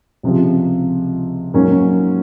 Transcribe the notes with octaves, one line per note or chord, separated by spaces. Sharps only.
C#2 C3 F3
G#2 F#3 A#3 C#4